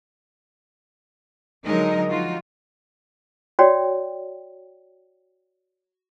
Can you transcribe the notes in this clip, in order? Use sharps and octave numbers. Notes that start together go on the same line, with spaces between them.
D3 F#3 G#3 D#4 A#4 D#5
F3 D#4 F4 F#4
F#4 C#5 D5 G5